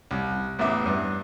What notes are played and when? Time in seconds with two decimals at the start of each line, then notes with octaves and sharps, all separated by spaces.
0.11 C2
0.59 A1 E2 E5 D6
0.86 G2